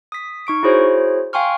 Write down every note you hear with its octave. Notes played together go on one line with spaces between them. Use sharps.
D#6 B6
D#4 C#6 D7
E4 F#4 G#4 C5 C#5
F5 G5 G#5 C6 C#6 F6